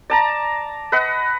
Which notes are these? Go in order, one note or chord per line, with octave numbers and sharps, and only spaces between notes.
D5 A5 A#5
B4 D#5 F#5